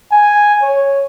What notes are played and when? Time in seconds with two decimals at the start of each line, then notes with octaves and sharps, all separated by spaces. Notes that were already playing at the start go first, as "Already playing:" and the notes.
0.11 G#5
0.62 C#5